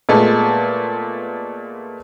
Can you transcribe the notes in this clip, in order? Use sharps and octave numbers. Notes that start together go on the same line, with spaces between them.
A#2 G#3 A3 B3